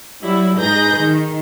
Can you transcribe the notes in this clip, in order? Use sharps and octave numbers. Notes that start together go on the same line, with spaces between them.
F#3 G3 E4
G#2 D#4 G#4 B4 G6 A#6
D#3